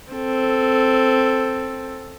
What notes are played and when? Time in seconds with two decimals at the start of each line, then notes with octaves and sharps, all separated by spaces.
0.13 C4 A4